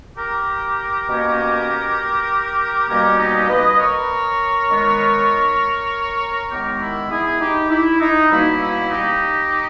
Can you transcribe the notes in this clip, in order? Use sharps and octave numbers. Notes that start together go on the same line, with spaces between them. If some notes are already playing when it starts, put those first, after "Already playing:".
G4 A#4
B2 A#3 C#4
B2 G3 A#3 C#4 G4 A#4
D#4 G4
B4 D#5
A#4 C#5
D#3 G#3 B3
D#3 G#3 B3 G4 A#4
E4
E4 G#4
D#4 G4
E4
D#4
B2 G3 A#3 C#4 E4
E4
D#4 G4